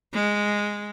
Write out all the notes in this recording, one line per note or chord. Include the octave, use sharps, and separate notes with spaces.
G#3